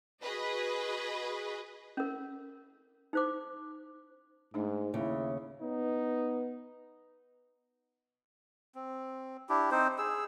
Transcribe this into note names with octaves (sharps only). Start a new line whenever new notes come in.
F#4 G#4 B4 D#5
C#4 A#4
D#4 C5 D6
G#2 A3 D4 D#4
D#2 C#3 E4
B3 D#4
C4
D4 E4 G4
C4 D#4 C5
G#4 E6